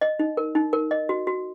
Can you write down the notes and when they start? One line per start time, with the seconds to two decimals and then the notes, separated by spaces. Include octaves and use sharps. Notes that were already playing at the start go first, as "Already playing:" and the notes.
0.01 D#5
0.19 D#4
0.37 A#4
0.55 D#4
0.73 A#4
0.91 D#5
1.09 F#4
1.27 F#4